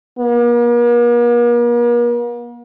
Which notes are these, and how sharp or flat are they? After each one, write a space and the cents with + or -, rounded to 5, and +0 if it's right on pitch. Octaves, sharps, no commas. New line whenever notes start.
A#3 +45